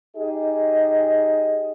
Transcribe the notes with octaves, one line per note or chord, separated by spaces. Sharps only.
D#4 G4 G#4 D#5